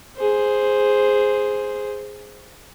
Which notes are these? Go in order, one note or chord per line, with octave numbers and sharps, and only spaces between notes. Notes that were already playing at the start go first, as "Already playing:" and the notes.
G#4 C5